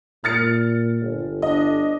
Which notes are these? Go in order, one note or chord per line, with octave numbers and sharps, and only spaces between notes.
A#2 F6 A6 C#7
G1
D4 D#5